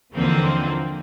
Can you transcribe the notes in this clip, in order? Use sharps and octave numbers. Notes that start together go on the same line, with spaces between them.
D#2 D3 E3 F3 A#3 C4